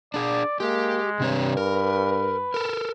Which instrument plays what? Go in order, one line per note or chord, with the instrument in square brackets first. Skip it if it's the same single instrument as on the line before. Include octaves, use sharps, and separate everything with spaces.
[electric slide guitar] D4 G#4 [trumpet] D5
[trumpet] G#3 [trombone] A#3 [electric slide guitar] G4
[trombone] G2 [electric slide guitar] C3 C4 C#5
[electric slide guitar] A#4 [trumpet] B4
[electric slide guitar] A4 A#4